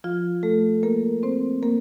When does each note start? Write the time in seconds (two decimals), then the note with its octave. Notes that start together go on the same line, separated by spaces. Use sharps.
0.04 F3 F4
0.43 A3 A4
0.83 A#3 A#4
1.23 C4 C5
1.63 A#3 A#4